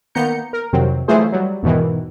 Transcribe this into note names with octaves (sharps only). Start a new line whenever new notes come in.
D#3 A#3 B3 A#5 G6 C#7
A#4
F2 C3 D#3 F#3 C4
E3 F#3 A3 F4 G#4 C5
F#3 G3
E2 G#2 B2 D#3 E3